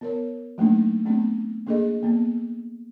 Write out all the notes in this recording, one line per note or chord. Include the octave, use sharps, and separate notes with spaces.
B3 A#4 C#5
F#3 A3 A#3 D4 D#4
A3 B3 C4 D4
A#3 D4 G#4 A4 D#5
A#3 B3